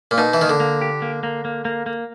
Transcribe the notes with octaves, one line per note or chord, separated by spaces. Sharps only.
A#2
B2 D#4
E3
D#3 A#3
D3
A#3
G4
A#3
A#3
A#3
A#3
A#3